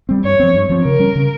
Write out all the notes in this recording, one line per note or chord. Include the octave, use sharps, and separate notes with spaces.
G3 C4
G2 C#5
F3 C4
G2
F3 C4
C#3 A#4
G3 C#4
C#3